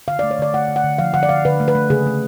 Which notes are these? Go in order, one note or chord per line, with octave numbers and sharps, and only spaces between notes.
D3 F5
A3 D5
C#5
D3 D5
A3 F#5
D3
F#5
D3
F3 F5
D3 F#5
D5
D3 F5
D3 B4
A3
B4
A3
C#3 G#4
A3